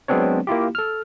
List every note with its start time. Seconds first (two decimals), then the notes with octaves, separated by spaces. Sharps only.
0.08 F#3 G#3 B3 C4 D4 C#5
0.47 A#3 E4 F4 G4
0.75 A4 F6